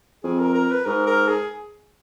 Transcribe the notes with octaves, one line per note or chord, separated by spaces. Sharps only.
F2 G#4
A#4
A#4
B4
G#2 A#4
A#4
G#4